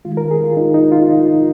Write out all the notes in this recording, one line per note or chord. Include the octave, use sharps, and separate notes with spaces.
D#3 G#3 F4
A#4
G#4
F4
D#4
D#4
F4
D#4
D#4